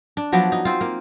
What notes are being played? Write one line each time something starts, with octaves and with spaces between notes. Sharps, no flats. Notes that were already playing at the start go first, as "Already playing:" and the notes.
D4
F3 F#3 B3 D5
D#4
C4 F4
A#3